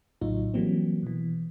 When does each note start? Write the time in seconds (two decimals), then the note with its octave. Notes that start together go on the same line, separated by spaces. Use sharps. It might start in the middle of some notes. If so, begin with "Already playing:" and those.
0.21 A#1 A2 C#3 F#3 D#4 F4
0.54 E3 F#3 G3 A#3 C4
1.03 B2 E3